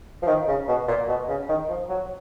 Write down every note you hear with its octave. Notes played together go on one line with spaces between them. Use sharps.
F3
D#3
C#3
B2
A#2
B2
C#3
D#3
F3
F#3